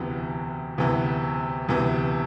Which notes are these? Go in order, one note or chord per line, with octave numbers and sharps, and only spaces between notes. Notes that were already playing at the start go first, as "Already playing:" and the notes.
Already playing: E1 D2 C3 E3 B3
E1 D2 C3 E3 B3
E1 D2 C3 E3 B3